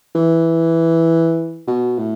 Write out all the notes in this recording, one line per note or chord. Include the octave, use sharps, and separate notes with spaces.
E3
B2
A2